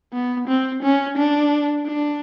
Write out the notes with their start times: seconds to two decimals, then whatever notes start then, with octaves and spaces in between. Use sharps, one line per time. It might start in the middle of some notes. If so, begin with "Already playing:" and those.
0.13 B3
0.48 C4
0.83 C#4
1.17 D4
1.87 D4